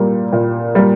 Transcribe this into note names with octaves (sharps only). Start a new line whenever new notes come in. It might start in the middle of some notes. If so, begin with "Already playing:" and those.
Already playing: A#2 G3 A#3
A#2
G3 A#3